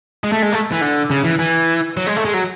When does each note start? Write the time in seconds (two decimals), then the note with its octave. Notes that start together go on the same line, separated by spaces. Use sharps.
0.24 G#3
0.32 A3
0.42 G#3
0.52 A3
0.72 E3
0.81 D3
1.10 C#3
1.24 E3
1.39 E3
1.97 F#3
2.07 G#3
2.16 A3
2.25 G#3
2.34 F#3